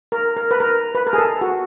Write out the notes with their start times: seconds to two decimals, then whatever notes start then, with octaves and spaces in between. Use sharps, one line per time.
0.12 A#4
0.37 A#4
0.51 B4
0.60 A#4
0.95 B4
1.07 A#4
1.13 G#4
1.18 A4
1.41 F#4